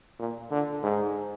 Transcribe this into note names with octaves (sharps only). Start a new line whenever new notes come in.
A#2
D3
G#2